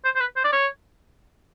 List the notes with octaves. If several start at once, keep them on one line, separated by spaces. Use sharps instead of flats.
C5
C5
B4
C5
D5
C#5